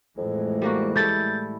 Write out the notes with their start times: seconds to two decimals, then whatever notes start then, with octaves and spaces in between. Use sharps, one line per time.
0.18 F2 A2 E3 G#3
0.62 G3 A#3 F#4
0.96 G3 A3 E4 G6 A6